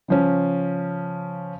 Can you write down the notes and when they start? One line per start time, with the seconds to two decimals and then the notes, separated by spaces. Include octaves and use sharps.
0.08 C#3 F3 C#4